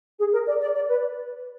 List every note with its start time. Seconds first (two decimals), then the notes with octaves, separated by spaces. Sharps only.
0.19 G#4
0.32 A#4
0.46 D5
0.61 D5
0.75 D5
0.89 B4